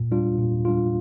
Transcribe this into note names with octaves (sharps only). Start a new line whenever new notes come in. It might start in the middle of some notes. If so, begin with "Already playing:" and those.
Already playing: A#2
G3 D4 F4
A#2
G3 D4 F4